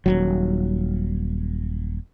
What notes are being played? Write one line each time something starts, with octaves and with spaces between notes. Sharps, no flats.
D#1 G#1 F#3